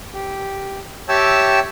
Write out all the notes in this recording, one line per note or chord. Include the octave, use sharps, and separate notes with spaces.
G4
G4 C#5 E5 G5 A5 E6